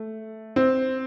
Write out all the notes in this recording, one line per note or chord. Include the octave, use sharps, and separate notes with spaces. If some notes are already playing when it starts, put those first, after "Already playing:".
Already playing: A3
C4